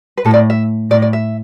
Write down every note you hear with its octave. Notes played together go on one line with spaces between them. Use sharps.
B4
A2 A4
D5
E5
A2 D5
D5
E5